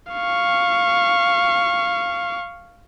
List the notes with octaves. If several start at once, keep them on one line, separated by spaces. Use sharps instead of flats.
F5 C#6